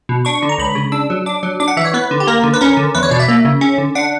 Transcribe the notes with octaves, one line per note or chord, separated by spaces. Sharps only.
B2
D4 C#6
D3
A#5
C#2 B5
C#3
D4 E6
F#3
D4 D6
F#3
D4 D6
F#5
E3 E5
C#5
B3 B4
D3
G4
A#3 A#4
D3
B4
C#4 A#4
D3
E2 B4
C#5
B2 D5
E5
A#3
C#3
C#4
D3
D4 F#5